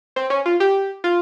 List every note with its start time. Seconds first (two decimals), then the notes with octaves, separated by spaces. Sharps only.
0.16 C4
0.30 C#4
0.46 F4
0.60 G4
1.04 F4